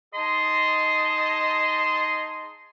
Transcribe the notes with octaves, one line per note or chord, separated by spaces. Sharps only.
D#4 G#4 D#5 A5 C6